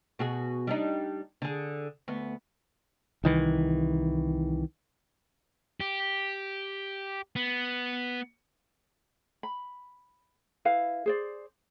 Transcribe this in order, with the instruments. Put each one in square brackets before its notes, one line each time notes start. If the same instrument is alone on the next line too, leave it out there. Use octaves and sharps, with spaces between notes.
[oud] B2 F#4 G#4
G3 D4 D#4
D3 G#4
D2 B3
[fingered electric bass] C2 D#3 E3
[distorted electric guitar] G4
B3
[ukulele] B5
E4 B4 F5
G#4 C5 D5